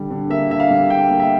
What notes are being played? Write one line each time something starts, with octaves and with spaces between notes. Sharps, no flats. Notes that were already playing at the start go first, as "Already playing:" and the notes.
Already playing: D3 G3
D3
A#3 E5
D3 E5
F5
G3
D3 G5
A#3
E5